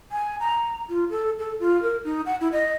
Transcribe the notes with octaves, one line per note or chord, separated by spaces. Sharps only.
G#5
A#5
F4
A4
A4
F4
A#4
D#4
F#5
E4
D#5